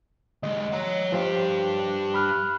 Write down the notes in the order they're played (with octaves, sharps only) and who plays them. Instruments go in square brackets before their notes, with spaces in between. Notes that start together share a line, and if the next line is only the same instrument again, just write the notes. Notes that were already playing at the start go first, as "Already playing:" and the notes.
[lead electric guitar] D#2 G#3 [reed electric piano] D#5
[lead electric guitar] C#5 A#5
[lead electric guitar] G2 G4 [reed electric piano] F3 C5 F5
[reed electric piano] B5 F6 F#6